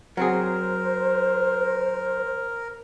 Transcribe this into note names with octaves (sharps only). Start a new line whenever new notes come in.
F#3 C4 G#4 A#4 C5